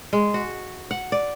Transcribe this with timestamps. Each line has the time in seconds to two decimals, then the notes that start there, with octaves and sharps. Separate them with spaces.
0.13 G#3
0.34 F#4
0.91 F#5
1.12 D5